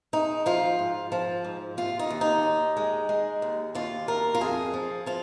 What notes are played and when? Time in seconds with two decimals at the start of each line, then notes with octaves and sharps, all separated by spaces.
0.13 G#3 D#4
0.46 F3 F4
0.79 G#2
1.12 F3
1.44 G#2
1.77 D#2 F4
1.99 D#4
2.11 D#2
2.21 D#4
2.43 D#2
2.77 G#3
3.09 G#3
3.42 D#2
3.75 D#2 F4
4.08 D#2 A#4
4.35 F4
4.41 F2 G#4
4.74 F3
5.06 F3 F4